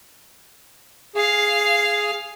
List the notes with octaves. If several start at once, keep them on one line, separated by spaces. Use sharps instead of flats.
G#4 F5